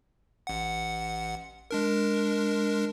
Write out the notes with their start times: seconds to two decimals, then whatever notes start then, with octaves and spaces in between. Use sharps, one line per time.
0.47 A1 F#5
1.71 G#3 D4 A#4